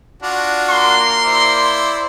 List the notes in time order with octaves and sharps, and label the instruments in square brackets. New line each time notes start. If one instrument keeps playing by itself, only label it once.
[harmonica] D4 F4 F#4
[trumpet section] A#3 C6
[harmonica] E4 C5 D5